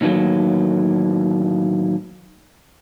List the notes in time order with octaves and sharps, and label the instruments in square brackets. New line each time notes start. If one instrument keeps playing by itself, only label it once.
[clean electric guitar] A2 D#3 E3 F#3 A#3